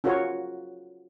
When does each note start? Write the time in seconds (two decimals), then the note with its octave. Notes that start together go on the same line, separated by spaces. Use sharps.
0.04 C#4 F4 F#4 A#4 C#5